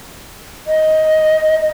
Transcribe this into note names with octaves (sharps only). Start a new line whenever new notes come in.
D#5